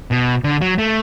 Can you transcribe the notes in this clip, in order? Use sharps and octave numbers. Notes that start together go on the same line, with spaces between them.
B2
D3
F#3
A3